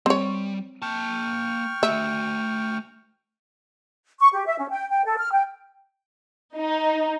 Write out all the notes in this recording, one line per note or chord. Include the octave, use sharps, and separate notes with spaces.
G3 C4 C#5
A#3 G5 A5 C#6 F6
A3 F#4 E5
C#6
G4
E5
C#4
G5
G5
A4
F6
G5
D#4